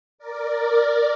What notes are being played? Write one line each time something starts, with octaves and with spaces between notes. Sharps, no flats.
A#4 D5